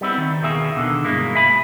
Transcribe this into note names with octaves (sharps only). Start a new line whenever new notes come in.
G3 B3 C4 E4
D#3
D#2 B2 A#3 B3 G#4 E5
B2 D3 D#3
G2 B2 G#3 A#3 E4
E5 G#5 B5